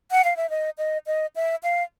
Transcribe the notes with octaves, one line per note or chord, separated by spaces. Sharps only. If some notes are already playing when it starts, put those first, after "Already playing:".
F#5
F5
E5
D#5
D#5
D#5
E5
F5